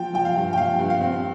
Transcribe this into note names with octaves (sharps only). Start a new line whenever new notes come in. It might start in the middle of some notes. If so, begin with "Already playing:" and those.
Already playing: F3 G5
F3 G5
F5
G2
G5
F3 F5
G2
F5
C4